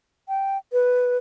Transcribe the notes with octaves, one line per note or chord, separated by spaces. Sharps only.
G5
B4